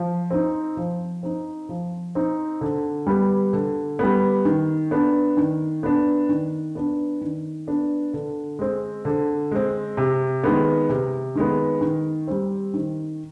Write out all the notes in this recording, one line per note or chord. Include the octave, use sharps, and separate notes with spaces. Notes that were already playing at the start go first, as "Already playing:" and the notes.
Already playing: F3
C4 D#4
F3
C4 D#4
F3
C4 D#4
D3
G3 B3
D3
G3 B3
D#3
B3 D4
D#3
B3 D4
D#3
B3 D4
D#3
B3 D4
D3
G#3 C4
D3
G#3 C4
C3
D#3 G#3 B3
C3
D#3 G#3 B3
D#3
G3 C4
D#3